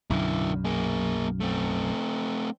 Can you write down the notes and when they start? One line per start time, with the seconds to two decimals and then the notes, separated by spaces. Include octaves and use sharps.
0.10 B1 F#2 D3 E4
0.65 A#3 G#4
1.40 A3 C4